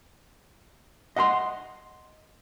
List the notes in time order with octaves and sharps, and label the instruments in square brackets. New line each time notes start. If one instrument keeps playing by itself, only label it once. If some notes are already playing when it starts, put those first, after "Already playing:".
[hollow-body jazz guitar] D#5 F#5 A#5 C6